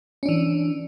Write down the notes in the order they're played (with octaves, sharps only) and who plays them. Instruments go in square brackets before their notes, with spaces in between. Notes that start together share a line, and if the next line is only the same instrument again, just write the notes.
[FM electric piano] C#4
D4
E3